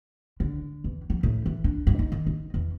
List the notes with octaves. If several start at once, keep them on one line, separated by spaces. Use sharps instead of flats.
D3
E2
F3
A2
E3
D4
G2
D#4
D#3
D#4
E2